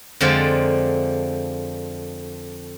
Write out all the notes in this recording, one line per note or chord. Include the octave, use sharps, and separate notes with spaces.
F2 D3 F3 G#3 F4 D5